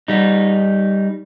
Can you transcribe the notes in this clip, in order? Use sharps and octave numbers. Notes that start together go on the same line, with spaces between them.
G3 D#4